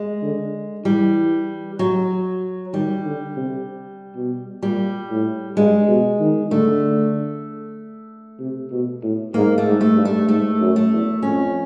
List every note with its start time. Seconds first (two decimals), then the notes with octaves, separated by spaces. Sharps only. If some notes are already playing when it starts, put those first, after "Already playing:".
Already playing: G#3
0.22 D3
0.85 E3 G3
1.79 F#3
2.74 D#3 G3
3.05 D3
3.37 C3
4.16 B2
4.62 A#2 G3
5.10 A2
5.56 G2 G#3
5.88 B2
6.20 D#3
6.51 D3 A3
8.39 C3
8.71 B2
9.03 A2
9.34 G#2 A#3
9.58 A3
9.66 G#2
9.81 A3
9.97 G2
10.05 A3
10.29 G#2 A3
10.60 F#2
10.76 A3
10.92 E2
11.22 F2 C#4